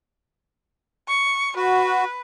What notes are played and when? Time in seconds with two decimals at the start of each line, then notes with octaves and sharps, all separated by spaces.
1.08 C#6
1.56 F#4 B4